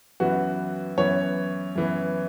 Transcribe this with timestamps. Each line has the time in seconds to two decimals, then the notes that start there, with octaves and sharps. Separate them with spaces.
0.20 F#2 E3 B3 F#4
0.97 F#2 E3 B3 C#5
1.75 F#2 E3 B3